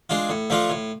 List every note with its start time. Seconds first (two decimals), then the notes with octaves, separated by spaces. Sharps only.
0.10 G#3 D4 F4
0.29 A2
0.50 F3 A3 D4 F4
0.70 A2